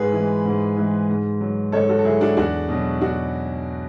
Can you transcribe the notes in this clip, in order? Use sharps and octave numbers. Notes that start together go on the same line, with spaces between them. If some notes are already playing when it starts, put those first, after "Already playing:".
Already playing: G#2 G#4 B4
E3 G#3
G#2
E3 G#3
G#2
F#3
G#2 A4 C#5
F#4 A4
A4
F#3 E4 G#4
D4 F#4
E2 D4 F#4
B2 F#3
D4 F#4